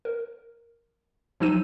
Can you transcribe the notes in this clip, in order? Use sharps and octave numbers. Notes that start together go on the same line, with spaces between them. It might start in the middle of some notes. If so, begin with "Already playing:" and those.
A#4
F3 F#3 D#4 E6 D#7